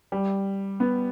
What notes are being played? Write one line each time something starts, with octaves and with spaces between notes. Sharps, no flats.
G3
B3